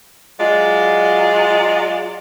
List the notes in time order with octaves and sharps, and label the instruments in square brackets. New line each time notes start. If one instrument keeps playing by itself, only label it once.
[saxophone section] F#3 G#3 F4 D5